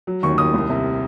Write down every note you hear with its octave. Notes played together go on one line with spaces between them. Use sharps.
F#3
D#2 C#6
D#2 D#6
C2
C3